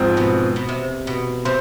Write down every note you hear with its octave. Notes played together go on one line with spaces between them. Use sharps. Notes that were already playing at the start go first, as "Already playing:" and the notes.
Already playing: G#2 F3 C4
B2
B2
C3
B2
C3 C5